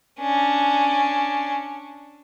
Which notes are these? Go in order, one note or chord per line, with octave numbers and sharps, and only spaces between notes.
C#4 D4